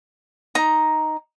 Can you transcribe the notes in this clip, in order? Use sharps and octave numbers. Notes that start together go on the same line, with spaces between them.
D#4 A#5